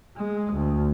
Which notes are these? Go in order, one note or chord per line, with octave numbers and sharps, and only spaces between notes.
G#3
D2